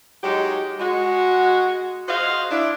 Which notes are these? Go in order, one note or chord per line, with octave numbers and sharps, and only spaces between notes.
F#3 G#3 D#4 G4
G#3 F#4
F#4 G#4 C5 D#5 F5
D4 E4